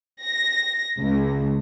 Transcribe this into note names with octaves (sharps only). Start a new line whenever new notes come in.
A#6
C#2